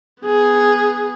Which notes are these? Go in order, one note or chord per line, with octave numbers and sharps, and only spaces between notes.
B3 G#4